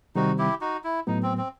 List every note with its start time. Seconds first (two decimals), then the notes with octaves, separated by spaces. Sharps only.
0.15 C3 D#3 G3 C4 D#4 F#4
0.38 E4 G4
0.61 D#4 F#4
0.84 E4
1.07 A2 F#3 B3 D#4
1.23 C4
1.38 C4